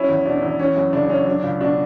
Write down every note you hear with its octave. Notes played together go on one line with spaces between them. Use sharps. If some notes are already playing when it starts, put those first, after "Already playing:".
Already playing: F#3 C#4 E4
E2
B2 D4
E2
E3 C#4
F#2
C#3 D4
F#2 C#4
F#3 D4
C#2
B2 D4